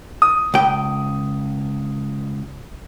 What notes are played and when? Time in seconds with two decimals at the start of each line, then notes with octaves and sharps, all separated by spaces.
0.22 D#6
0.54 C#2 G5